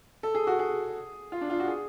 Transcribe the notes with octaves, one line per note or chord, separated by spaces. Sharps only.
A4
G#4
F#4
G#4
F4
D4
F4
F#4
G#4